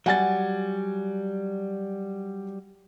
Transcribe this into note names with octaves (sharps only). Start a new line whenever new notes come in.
F#3 G3 F#5 G#5 A6